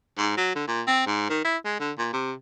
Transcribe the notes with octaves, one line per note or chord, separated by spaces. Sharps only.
G#2
F#3
D3
A#2
C4
G#2
D#3
E4
G#3
D3
A#2
C3